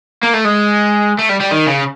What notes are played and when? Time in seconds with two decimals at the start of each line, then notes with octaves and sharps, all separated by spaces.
0.23 A#3
0.33 A3
0.44 G#3
1.19 A3
1.29 G3
1.40 G3
1.51 D#3
1.67 C#3